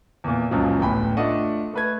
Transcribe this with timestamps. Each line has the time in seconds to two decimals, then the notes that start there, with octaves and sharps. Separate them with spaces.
0.24 E2 A#2
0.51 C#2 F#2 A#2 C#3 F3 F#3
0.79 D1 A1 E2 G5 B5
1.17 A3 D4 F4 D#5 F#5
1.73 A3 B4 G#6